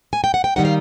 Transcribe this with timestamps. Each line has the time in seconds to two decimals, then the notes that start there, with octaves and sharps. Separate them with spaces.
0.13 G#5
0.24 G5
0.34 F#5
0.44 G5
0.56 D#3 G3 A#3 D#4 F#5
0.65 F5